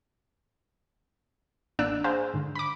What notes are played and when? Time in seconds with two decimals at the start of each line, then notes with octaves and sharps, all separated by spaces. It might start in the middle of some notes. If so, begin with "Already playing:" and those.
1.79 A1 A#3 D4 D5 E6 F#6
2.04 G#4 C5 F5 A#5
2.34 G#2 D3
2.55 B5 D6